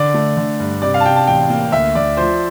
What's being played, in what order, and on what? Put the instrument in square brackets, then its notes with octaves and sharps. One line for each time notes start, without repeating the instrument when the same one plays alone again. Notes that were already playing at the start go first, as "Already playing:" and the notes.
Already playing: [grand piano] D3 [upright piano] D5
[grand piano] A3
D3
G2
[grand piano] C3 [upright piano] D5
[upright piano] F5
A5
[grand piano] C3 [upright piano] G5
[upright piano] A5
[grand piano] A1 [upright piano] G5
[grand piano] A#3
[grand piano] D2 [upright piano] E5
[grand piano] D2 [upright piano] D5
[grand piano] F3 [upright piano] C5